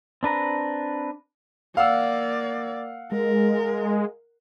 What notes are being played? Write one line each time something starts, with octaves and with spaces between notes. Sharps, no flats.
C4 D4 B4 A#5
A#3 D5 F5 F#5 E6
G#3 A#4